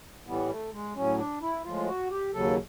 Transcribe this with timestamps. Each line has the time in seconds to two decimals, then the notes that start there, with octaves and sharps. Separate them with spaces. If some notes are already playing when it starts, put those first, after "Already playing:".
0.27 A2 E3 G3 B3
0.50 A3
0.73 G#3
0.95 A2 F#3 C#4
1.18 D4
1.42 E4
1.64 A2 F3 G#3 F4
1.87 F#4
2.10 G4
2.34 D#2 C#3 F#3 A4